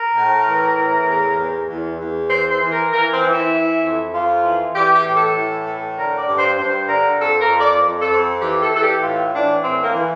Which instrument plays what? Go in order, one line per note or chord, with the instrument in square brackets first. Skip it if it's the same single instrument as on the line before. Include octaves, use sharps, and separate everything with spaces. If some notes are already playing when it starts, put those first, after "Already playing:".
Already playing: [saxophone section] A#4
A2
E3
A2
E2
E2
E2
E2
E3 C5
C5
E3
A#4
E3 A#4
C4
E3
E4
E3
F2
F2 F4
E3
E3 G4
G4
A2
A4
E3
A2
D3 A#4
D5
G2
C5
G2 C5
D3 A#4
F2 A4
A#4
F2
D5
F2
A4
F2
E3 G4
A4
E3 A4
G4
A2 F4
E3 D4
A2 C4
A#3
E3